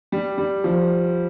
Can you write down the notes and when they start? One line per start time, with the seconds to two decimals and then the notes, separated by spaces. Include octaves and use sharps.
0.12 G3
0.38 G3
0.64 F3